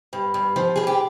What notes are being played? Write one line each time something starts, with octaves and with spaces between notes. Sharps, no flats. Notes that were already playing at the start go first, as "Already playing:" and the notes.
G2
G2
F3
G2 G#4
G4